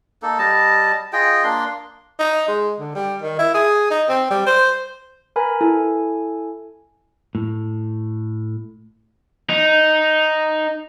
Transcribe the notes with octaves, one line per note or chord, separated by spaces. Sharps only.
A#3 D#4 A4
G3 D#5 A5
F4 G#4 D#5 G5
A#3 D4 C6
D#4
G#3
D3
G3
D#3
E4
G#4
D#4
C4
G3
C5
A#4 B4 G#5 A#5 B5
E4 A4 G#5
A2
D#4